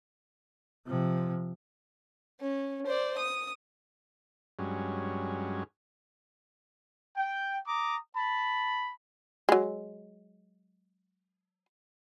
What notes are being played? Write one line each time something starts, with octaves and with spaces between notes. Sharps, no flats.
C3 F3
C#4
C5 D5
D#6
G2 F#3 G#3 C#4
G5
A#5 D6 D#6
A5 B5
F#3 G#3